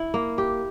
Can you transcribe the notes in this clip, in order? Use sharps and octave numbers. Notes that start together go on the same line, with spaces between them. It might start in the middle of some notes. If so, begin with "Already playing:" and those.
Already playing: E4
A#3
G4